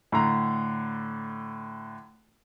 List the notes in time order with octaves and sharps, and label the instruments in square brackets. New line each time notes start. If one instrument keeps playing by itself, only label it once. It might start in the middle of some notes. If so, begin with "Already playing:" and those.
[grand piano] A2 D3 A#5